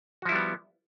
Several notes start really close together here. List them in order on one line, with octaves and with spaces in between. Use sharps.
F#4 F3 E4 G3 B3